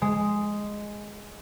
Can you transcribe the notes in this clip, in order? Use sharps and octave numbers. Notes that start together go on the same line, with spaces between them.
G#3